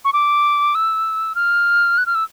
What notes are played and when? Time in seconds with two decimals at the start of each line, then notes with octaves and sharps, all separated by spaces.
0.05 C#6
0.13 D6
0.75 E6
1.35 F6
1.98 F#6
2.06 F6
2.15 E6